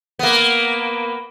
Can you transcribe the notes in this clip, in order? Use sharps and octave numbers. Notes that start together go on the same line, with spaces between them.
A#3 B3